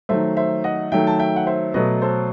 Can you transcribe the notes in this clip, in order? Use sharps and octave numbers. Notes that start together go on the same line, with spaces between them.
D#3 F#3 A3 C5 E5
C5 E5
D#5 F#5
D#3 F#3 A3 E5 G5
A5
E5 G5
F#5
C5 E5
B2 F#3 A3 B4 D#5
A4 C5